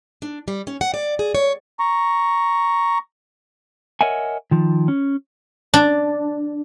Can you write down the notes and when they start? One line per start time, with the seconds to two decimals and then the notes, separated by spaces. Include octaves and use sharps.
0.22 D4
0.48 G3
0.67 C#4
0.81 F#5
0.94 D5
1.19 G#4
1.35 C#5
1.80 A#5 C#6
4.01 A#4 C#5 D#5 E5 F#5 G#5
4.51 D#3 F3
4.88 C#4
5.74 D4